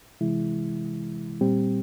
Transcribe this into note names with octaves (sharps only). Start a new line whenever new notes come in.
C3 E3 G#3 E4
A#2 G3 C4 G4